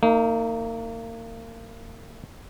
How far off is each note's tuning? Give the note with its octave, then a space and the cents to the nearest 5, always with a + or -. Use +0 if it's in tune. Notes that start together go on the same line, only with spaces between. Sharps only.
A#3 -35 D#4 +10